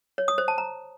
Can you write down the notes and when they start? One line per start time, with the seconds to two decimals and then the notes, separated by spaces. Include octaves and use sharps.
0.18 C#5
0.28 D#6
0.38 C5
0.48 A5
0.58 A#5